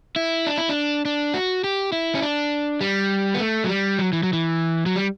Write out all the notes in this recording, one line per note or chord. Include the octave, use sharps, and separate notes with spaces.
E4
D4
E4
D4
D4
F#4
G4
E4
C#4
D4
G3
B3
A3
F#3
G3
F#3
E3
F#3
E3
F#3
G3